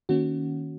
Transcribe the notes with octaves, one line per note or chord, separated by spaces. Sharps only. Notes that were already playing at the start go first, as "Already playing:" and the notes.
D#3 A#3 C#4 F#4